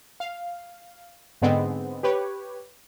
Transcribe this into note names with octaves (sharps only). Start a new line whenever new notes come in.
F5
G#2 D3 G#3 B3 C4
G4 B4 C#5